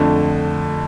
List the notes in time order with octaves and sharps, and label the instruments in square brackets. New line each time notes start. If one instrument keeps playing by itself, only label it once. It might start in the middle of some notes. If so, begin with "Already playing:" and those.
Already playing: [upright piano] F2 D3 A3